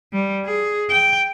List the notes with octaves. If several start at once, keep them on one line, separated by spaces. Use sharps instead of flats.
G3
G#4
G5